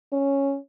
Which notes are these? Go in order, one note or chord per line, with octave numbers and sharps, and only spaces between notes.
C#4